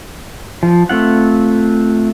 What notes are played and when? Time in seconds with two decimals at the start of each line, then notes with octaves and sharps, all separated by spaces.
0.63 F3
0.89 A3 C4 F4 F#5